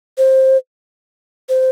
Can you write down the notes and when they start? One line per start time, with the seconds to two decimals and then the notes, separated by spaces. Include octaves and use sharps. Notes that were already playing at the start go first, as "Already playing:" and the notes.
0.18 C5
1.49 C5